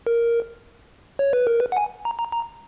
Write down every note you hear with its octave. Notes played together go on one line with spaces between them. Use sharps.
A#4
C#5
B4
A#4
B4
F#5
G#5
A#5
A#5
A#5